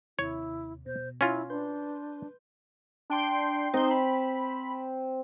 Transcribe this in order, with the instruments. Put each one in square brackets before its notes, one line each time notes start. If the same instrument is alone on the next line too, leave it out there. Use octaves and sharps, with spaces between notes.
[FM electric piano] D#2 C3 [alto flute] E4 [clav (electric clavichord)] C#5
[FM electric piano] B2 [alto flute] C5
[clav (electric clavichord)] C#4 F4 [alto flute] E4
[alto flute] D4 [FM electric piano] B4 C6 G6
[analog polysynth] D4 G5 C6
[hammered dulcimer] C4 [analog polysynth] D#4 C6
[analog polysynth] B5